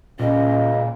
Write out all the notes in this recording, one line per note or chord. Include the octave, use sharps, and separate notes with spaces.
C#2 A#2 C#4 D#5